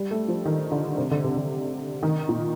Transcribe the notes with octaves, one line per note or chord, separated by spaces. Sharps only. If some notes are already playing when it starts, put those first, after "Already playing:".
Already playing: G3
A3
F3
D#3
D3
C3
D3
C3
D3
D#3
A#2